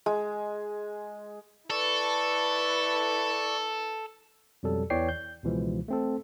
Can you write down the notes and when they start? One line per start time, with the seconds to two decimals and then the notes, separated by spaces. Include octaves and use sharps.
0.06 G#3
1.70 E4 A4 B4 D5 C#6
4.63 F2 B2 F#3 G3 A4
4.90 E2 E3 C#5 D5 G5 C7
5.09 G6
5.43 C#2 B2 E3 F3 G#3
5.88 A3 C4 A4